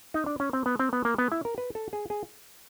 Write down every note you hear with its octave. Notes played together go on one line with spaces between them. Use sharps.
D#4
D4
C#4
C4
B3
C4
B3
A#3
B3
E4
A#4
B4
A4
G#4
G#4